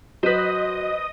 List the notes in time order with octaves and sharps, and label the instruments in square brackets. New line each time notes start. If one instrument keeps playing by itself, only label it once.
[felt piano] F#3 [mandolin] B4 C5 [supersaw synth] D#5 D#6